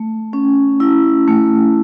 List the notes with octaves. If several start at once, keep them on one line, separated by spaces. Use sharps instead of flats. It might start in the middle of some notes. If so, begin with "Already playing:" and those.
Already playing: A3
C#4
E4
A3